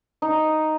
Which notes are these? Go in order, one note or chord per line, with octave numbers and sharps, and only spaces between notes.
D#4